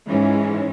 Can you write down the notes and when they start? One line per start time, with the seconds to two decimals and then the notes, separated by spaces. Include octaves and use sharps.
0.08 G#2 E3 G#3 C#4